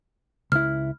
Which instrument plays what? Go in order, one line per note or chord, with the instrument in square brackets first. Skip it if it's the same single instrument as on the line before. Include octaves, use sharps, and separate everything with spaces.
[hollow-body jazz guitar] C#2 E4 [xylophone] F6